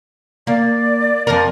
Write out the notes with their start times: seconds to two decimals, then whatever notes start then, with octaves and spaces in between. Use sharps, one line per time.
0.47 A#3 D5
1.27 F2 A#4 D5